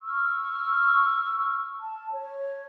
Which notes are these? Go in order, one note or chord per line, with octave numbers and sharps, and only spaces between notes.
C#6 E6 F6
A5
C#5